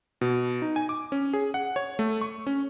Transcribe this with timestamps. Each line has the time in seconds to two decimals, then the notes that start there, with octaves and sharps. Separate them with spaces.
0.21 B2
0.62 D#4
0.76 G#5
0.89 D6
1.12 C#4
1.33 G#4
1.54 F#5
1.76 C#5
1.99 A3
2.21 C#6
2.47 C#4